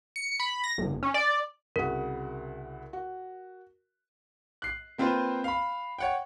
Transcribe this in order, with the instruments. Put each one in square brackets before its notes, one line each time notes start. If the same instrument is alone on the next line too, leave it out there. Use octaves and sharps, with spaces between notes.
[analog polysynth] C#7
B5
A#6
G1
C#4
D5
[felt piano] C2 C#3 F#4 [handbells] A#4
[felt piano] F#4
[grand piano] F#6 C7
A#3 C4 F4 B4 C5
F5 B5
C#5 F#5 G5